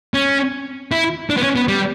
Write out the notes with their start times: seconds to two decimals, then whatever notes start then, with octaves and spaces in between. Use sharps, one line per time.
0.14 C#4
0.92 E4
1.30 D4
1.37 B3
1.43 C#4
1.56 B3
1.68 G3